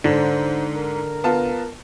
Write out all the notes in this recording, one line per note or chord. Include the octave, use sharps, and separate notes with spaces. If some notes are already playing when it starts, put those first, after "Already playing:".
G#2 D3 C5
A#4
B3 F4 A5